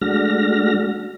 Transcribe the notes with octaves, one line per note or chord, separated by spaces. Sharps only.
G#3 A3 D4 F#4 F6 A#6